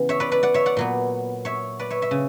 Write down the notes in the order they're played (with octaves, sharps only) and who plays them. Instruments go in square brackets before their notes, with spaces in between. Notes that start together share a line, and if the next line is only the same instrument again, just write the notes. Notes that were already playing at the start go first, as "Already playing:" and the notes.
Already playing: [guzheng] C#3 E3 B3
C#5 E5
B4 D5
B4 D5
D5 F#5
C#5 E5
D5 F#5
A#2 F#3 B3
C#5 E5
B4 D5
C#5 E5
C#5 E5
C#3